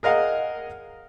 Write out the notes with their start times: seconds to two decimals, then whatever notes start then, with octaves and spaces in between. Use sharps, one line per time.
0.03 G#4 A#4 D#5 F5 F#5